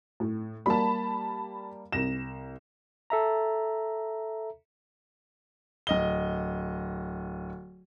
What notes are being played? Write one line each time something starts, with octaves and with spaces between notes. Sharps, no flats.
A2
G3 A#3 A5 B5
C2 A#6 E7
A4 E5 A#5
D1 D#5 G7